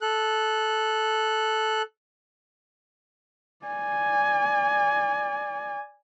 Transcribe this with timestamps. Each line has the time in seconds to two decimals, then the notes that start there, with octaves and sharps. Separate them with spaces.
0.01 A4 F#6
3.66 D5 G#5